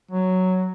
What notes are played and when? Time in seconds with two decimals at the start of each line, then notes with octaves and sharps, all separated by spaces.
0.11 F#3